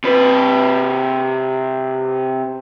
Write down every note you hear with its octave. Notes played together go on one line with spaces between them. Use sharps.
C3 B4